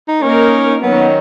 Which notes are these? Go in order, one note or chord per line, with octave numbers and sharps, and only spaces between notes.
D#4
A#3 C#4 D#4 A#4
D#3 F#3 B3 C#4